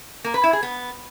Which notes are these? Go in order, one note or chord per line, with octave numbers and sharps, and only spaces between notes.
A#3
B4
E4
G#4
B3